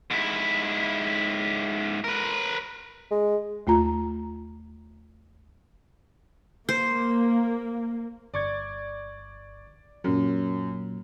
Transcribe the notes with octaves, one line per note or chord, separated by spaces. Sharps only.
G#2 E4
A#4 B4
G#3
D#2 A3 F4 A#5
A#3 C5
G1 D5 C#6 G#6
F#2 A#2 F#3